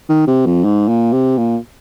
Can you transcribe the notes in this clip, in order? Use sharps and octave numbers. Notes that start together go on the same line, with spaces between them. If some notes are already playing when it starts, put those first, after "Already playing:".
D#3
C3
F2
G#2
A#2
C3
A#2